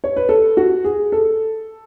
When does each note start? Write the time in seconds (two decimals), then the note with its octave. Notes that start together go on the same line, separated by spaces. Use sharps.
0.04 C#5
0.16 B4
0.29 A4
0.57 F#4
0.84 G#4
1.12 A4